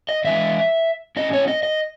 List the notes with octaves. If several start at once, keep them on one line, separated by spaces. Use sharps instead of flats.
D#5
A2 E3 G#3 E5
A2 G#3 C#4 D#5
C#5
D#5
D#5